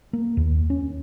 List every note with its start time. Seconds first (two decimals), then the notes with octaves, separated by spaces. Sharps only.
0.13 A#3
0.37 D#2
0.70 C#4